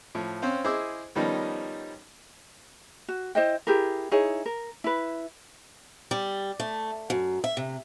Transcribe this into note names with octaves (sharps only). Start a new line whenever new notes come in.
A2 F3
C4 C#4 C5 F5
E4 G#4 C5 D#5 D6 E6
D#3 F3 G3 B3 C#4 D#4
F#4
E4 C5 D#5 G5
E4 G4 G#4 A#4
D#4 E4 G#4 C#5
A#4
E4 B4
G3
A3
F#2
E5
C3